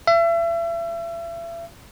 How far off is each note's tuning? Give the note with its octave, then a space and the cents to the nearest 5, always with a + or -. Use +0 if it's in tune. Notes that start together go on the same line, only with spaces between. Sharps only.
E5 +35